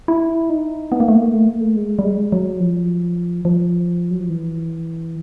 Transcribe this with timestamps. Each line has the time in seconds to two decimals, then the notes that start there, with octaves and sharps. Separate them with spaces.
0.08 E4
0.50 D#4
0.92 B3
1.00 A#3
1.08 A3
1.16 A#3
1.34 A3
1.47 A#3
1.61 A3
1.76 G#3
1.99 G3
2.04 G#3
2.32 F#3
2.60 F3
3.45 F3
4.11 F#3
4.20 F3
4.29 E3